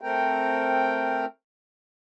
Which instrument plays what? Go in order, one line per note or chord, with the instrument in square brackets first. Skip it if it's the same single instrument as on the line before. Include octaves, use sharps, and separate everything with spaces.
[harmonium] A3 C4 A#4 G5